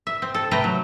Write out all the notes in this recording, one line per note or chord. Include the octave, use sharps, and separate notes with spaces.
E5
C4
A4
C3 A3 B4 G5 A#5
F#3